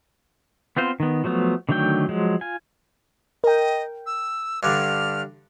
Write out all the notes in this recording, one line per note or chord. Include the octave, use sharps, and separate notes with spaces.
B3 C4 F4 C5
D#3 B3
F3 F#3 A3 B3
D3 D#3 F#3 A3 G5
F3 F#3 G#3
F4 G#5
A#4 D#5 G5
E6
G2 D3 F6